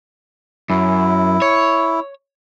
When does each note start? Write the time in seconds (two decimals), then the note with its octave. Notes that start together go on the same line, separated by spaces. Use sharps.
0.70 F#2 E4
1.42 C#5